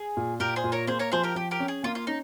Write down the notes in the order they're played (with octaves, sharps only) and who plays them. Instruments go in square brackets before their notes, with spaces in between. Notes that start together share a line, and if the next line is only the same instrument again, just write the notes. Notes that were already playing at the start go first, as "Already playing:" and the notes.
Already playing: [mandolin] G#4
[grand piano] A#2
[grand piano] A#2 [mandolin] G4 A#4
[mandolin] G#4 C5
[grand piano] A#2
[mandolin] A#4 C#5
[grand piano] A#3 [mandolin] G#4 C5
[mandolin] A#4 C#5
[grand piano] F3 [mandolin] G#4 C5
[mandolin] G4 A#4
[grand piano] F3 [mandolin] G4
[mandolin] G4 A#4
[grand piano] C#4
[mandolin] G#4
[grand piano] A#3 [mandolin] F4
[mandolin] F4
[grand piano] C#4 [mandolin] D#4